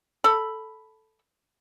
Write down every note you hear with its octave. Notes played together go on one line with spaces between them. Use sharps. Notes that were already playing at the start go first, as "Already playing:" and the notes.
A4 B5